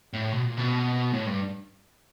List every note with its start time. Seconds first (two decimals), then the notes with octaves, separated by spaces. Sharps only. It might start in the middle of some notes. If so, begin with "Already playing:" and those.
0.13 A2
0.33 B2
0.44 A#2
0.57 B2
1.13 A2
1.26 G2